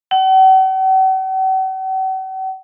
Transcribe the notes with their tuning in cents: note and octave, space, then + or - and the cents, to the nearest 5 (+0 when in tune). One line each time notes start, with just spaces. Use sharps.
F#5 +45